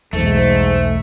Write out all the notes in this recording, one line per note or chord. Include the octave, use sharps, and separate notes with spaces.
B1 E2 G#2 F#3 A3